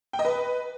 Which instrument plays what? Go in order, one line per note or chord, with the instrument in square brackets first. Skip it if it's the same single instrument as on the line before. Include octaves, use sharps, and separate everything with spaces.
[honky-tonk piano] G5
D#5
B4